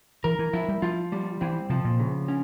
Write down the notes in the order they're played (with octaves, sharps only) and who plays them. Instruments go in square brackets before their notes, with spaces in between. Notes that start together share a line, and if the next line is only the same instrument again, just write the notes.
[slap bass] E3 [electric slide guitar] A#4
[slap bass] E3
[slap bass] F3 [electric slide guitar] E4
[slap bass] G3
[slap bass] F3 [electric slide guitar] F4
[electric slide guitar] G3
[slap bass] E3 [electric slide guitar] C4
[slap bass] C3 [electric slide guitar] F3
[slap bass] A#2
[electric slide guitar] C#3
C#4